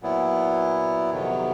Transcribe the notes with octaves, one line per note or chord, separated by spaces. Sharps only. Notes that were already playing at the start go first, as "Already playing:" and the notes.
A#2 F#3 B3 E4
F2 C3 D#3 F#3 B3